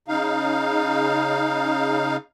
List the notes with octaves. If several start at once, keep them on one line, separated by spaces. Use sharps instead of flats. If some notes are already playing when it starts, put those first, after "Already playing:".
C#3 D#4 F5